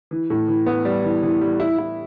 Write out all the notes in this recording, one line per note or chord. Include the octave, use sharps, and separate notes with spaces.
E3
A2
E3
B3
G3
E3
E3
G3
E4
E4